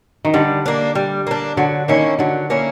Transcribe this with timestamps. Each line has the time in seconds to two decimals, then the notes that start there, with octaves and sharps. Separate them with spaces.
0.25 D#3
0.34 D3 G3
0.66 A#3 D4
0.95 G3
1.27 A#3 D4
1.57 D3 F#3
1.88 D#3 A#3 C#4 E4
2.19 D3 F#3
2.50 A#3 C#4 E4